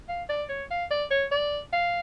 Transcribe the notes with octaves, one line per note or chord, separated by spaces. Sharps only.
F5
D5
C#5
F5
D5
C#5
D5
F5